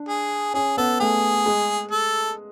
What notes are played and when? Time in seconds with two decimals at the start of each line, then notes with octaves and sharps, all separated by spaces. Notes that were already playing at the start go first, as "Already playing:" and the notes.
Already playing: D4
0.09 G#4
0.54 C#4 G#4
0.77 B3 A4
1.00 A3 G#4
1.46 G#3
1.91 A4